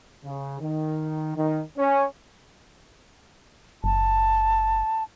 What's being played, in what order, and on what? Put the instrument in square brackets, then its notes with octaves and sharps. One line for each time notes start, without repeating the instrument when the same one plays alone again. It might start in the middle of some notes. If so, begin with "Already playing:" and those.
[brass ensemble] C#3
D#3
D#3
C#4
[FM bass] F#1 [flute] A5